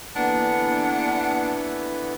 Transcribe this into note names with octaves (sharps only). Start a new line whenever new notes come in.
D3 E3 A#3 B3 D4 E4 D5 F#5